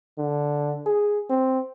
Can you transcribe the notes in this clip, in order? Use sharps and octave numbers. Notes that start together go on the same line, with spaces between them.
D3
G#4
C4